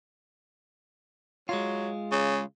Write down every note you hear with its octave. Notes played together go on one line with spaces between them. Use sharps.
F#3 G#3 F4
C#3